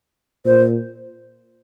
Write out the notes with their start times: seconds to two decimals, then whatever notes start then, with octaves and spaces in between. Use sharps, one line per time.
0.45 A#2 C5